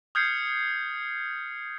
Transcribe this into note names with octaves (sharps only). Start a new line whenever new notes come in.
D#6 F6 G6 G#6 C7 C#7